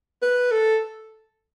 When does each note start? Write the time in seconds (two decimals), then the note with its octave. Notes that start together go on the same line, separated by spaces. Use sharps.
0.22 B4
0.51 A4